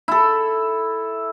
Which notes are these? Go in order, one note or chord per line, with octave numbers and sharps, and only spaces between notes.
E4 A4